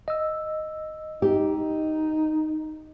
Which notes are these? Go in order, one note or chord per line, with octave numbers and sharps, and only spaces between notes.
D#5 E6
D#4 G4